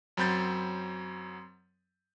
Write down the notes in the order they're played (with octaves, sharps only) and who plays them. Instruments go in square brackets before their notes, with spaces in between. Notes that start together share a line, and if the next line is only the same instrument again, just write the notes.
[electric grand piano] F#2 F#3 C4 B5 G6 A6